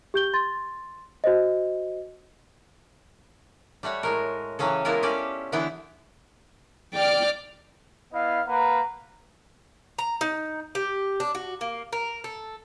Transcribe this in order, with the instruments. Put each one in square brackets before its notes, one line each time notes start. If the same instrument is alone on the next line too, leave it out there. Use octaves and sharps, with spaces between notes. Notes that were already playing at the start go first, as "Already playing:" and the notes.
[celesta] G4 G6 G7
C6 A6
F#4 C5 D#5
[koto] G3 A3 F#4 C#5
A2 G#3 A#4
C#3 E3 F#3 C#4 G#4 A4
G#3 A#3 B3 E4 F4 A#4
C#4 G4 A4 D5
D3 E3 B3 D4 E4 G5
[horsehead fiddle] D5 [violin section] G5 D6 F6
[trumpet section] B3 E4 D#5 F5
A#3 B4 F#5 A#5
[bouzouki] A#5
D#4
G4
D4
F#4
A#3
A#4
A4